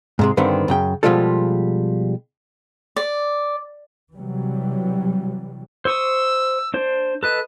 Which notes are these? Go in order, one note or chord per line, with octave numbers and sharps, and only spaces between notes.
G#2 C3 G#3
G2 D3 D#3 B3 C4
F#2 C#3 G5
B2 F3 G3 G#3 F4 A4
D5
C3 E3 F#3 G3
C5 C#6 D#6 E6
D4 C5
A4 B4 D#5 F#6